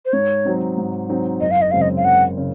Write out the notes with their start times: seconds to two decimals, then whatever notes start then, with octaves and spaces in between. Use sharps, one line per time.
0.05 C5
0.13 G#2 C#5
0.45 F#3 C4 D#4
0.78 G#2
1.09 F#3 C4 D#4
1.41 F#1 D#5
1.51 F5
1.62 D#5
1.71 F#2 C#3 G#3 C4 F5
1.82 D#5
1.97 F5
2.04 F#1 F#5
2.38 C#3